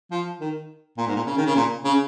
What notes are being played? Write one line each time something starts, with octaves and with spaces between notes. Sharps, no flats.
F3
D#3
A#2
G#2
A#2
C#3
D#3
C#3
A#2
C#3